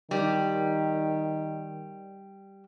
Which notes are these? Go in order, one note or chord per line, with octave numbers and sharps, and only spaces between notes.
D#3 G3